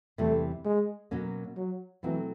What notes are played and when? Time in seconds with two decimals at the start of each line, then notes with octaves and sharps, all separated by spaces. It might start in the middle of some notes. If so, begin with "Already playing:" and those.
0.18 E2 C3 E3 G3 A3
0.65 G#3
1.11 B2 F#3 A#3 C#4
1.57 F#3
2.03 B2 E3 F#3 A3 C4